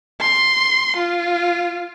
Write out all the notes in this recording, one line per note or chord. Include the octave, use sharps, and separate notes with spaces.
C6
F4